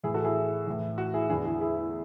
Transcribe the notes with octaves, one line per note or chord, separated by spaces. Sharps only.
A2 E3 E4 G#4
F#4 A4
E4 G#4
A2 E3
F#4
E4 G#4
E2 D3 E4 G#4
E4 G#4
E4 G#4
E4